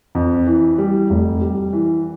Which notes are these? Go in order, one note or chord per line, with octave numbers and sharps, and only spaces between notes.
F2
E3
G3
F1
G3
E3